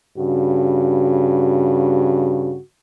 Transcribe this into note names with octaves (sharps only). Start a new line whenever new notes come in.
G2 C#3 F#4